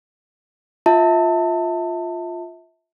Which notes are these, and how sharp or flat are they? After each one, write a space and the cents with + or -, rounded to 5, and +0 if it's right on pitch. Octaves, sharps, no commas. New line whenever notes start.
F4 +0 E5 -30 A5 +25